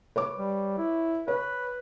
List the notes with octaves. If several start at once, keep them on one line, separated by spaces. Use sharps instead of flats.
B4 C#5 D6
G3
E4
B4 C#5